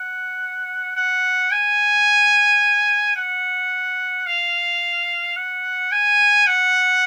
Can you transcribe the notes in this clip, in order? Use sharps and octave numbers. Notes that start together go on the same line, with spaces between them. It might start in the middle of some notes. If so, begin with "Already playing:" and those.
Already playing: F#5
F#5
G#5
F#5
F5
F#5
G#5
F#5